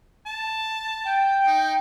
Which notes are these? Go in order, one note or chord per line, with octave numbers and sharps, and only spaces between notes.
A5
G5
D#4